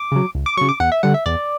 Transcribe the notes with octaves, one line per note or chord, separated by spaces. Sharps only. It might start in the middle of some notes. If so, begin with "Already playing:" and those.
Already playing: D6
C#3 F#3
C#2
D6
C#3 F#3 C#6
D6
E2 F#5
E5
D3 G3 F#5
E5
E2 D5